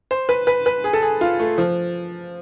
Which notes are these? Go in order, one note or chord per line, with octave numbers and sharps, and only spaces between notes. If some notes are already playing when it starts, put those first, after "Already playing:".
C5
B4
B4
B4
G#4
A4
G#4
F4
A3
F3